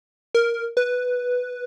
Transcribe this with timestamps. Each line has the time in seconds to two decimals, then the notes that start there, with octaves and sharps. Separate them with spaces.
0.35 A#4
0.77 B4